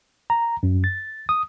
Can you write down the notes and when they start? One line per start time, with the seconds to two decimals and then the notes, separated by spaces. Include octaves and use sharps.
0.30 A#5
0.63 F#2
0.84 A6
1.29 D#6